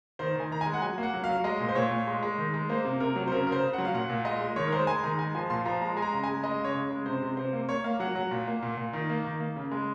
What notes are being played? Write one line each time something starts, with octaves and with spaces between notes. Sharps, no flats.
D#3 C5
D#3 G#5
D#3 A#5
G#5
G#3
F#5
F#3 G#5
A#3
F#5
F#3
F5
F#3
G#3 D#5
A#2
C5
A#2 C#5
A#2
G#3
G#3
D#3
G#3
A#3 C5
C3
C3 A#4
F#3
C5
C#3 A#4
C#3 A#4
C5
C#3
F#3 F#5
F5
A#2 F#5
A#2
G#3 D#5
G#3
D#3 C#5
A#4
G#3 C5
G#3 G#5
D#3 A#5
G#3 G#5
F3 G#5
A#2 C6
F3 A#5
G#3 A#5
G#3 G#5
A#5
C#3
G#3 G#5
G#3 D#5
C#3 C#5
C#3
G#3
C3 C5
C3
C3 C5
A#3
A#3 C#5
A#3 F5
F#3 F#5
F#3 F#5
A#2
A#3
A#2
A#2
D#3
A#3
D#3
A#3
C#3
G#3